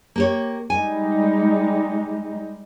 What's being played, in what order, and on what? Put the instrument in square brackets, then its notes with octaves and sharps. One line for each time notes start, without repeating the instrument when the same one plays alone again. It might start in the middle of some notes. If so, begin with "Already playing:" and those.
[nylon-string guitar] A#3 G4 C#5
[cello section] G3 G#3 D#4 [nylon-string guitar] G#5